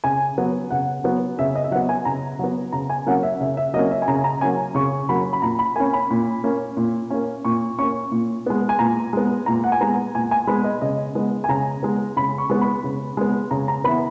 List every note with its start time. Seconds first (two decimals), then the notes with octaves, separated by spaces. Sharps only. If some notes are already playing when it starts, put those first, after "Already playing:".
0.04 C#3 G#5
0.38 F#3 B3
0.71 C#3 F#5
1.04 F#3 B3
1.39 C#3 E5
1.55 D#5
1.64 E5
1.71 F#3 F#5
1.75 B3
1.89 G#5
2.05 C#3 A#5
2.39 F#3 B3
2.73 C#3 A#5
2.90 G#5
3.06 F#3 A#3 C#4 F#5
3.23 E5
3.40 C#3 E5
3.57 E5
3.74 F#3 A#3 C#4 D#5
3.91 E5
4.02 G#5
4.08 C#3 A#5
4.24 A#5
4.41 F#3 A#3 C#4 G#5
4.75 C#3 C#6
5.09 F#3 A#3 C#4 B5
5.33 B5
5.42 A#2 A#5
5.59 B5
5.76 A#3 C#4 G#5
5.93 B5
6.10 A#2
6.44 A#3 C#4
6.77 A#2
7.10 A#3 C#4
7.45 A#2 C#6
7.79 A#3 C#4 C#6
8.12 A#2
8.46 G#3 B3
8.69 G#5
8.79 A#2 A#5
9.13 G#3 B3
9.46 A#2 A#5
9.64 F#5
9.72 G#5
9.81 G#3 B3 A#5
10.15 A#2 G#5
10.31 G#5
10.47 G#3 B3 B5
10.64 D#5
10.81 C#3 D#5
11.15 G#3 B3
11.44 G#5
11.49 C#3 A#5
11.83 G#3 B3
12.17 C#3 B5
12.38 C#6
12.50 G#3 B3
12.61 B5
12.84 C#3
13.17 G#3 B3
13.51 C#3 A#5
13.68 A#5
13.84 B3 B5
13.88 E3